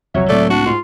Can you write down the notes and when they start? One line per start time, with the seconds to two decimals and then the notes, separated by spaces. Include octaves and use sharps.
0.14 C2 F2 F#3 C#5 E5
0.29 C#2 A2 A3 C4 D5
0.50 D4 F#4
0.66 G#2 F4